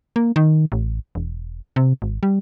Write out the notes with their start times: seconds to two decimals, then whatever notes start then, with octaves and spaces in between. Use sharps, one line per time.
0.16 A#3
0.36 D#3
0.72 A1
1.15 E1
1.76 C3
2.02 G#1
2.23 G3